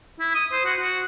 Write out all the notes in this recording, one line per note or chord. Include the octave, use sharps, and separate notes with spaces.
E4
D#6
C5
F#4
F#4